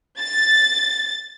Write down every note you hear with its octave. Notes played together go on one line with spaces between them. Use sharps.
A6